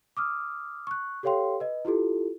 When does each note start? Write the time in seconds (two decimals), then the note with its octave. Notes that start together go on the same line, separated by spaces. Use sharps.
0.17 D6 D#6 F6
0.87 C#6 F#6
1.23 G4 A4 C#5 F5 G5 C6
1.60 B4 D#5
1.85 E4 F4 G4 A4